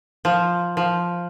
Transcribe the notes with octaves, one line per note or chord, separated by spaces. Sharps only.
F3
F3